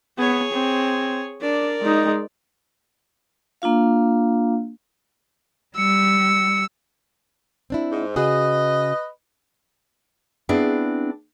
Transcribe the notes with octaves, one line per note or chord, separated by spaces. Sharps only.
B3 G#4 C#5
C4
D4 A#4 D5
G#3 D#4
A#3 D4 F4 F5
G3 E6 C#7
C4 D4 E4
G#2
C#3 F#4 G#4 B4 D#5
B3 C4 D4 E4 G#4